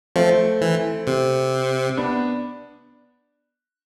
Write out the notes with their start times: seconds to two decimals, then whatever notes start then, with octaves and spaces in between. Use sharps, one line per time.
0.16 F3 A3 C4
0.61 E3
1.07 C3
1.97 B3 D4